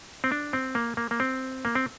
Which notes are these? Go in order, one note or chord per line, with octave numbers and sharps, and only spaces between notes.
C4
D4
C4
A#3
A#3
A#3
C4
A#3
C4